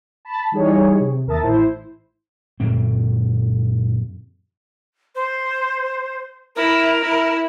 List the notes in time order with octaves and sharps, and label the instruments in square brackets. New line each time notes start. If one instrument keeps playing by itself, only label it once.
[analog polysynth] A5 B5
E3 G3 D#4 G#4 C#5
C3
D#2 A#4 E5 A5 D#6 A6
A1 E4 C5
[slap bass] F#2 A#2 D3 C4
[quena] C5
[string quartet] E4 [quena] A#4
[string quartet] E4